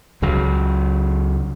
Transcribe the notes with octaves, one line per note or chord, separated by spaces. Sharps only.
C#2 C#3 F#3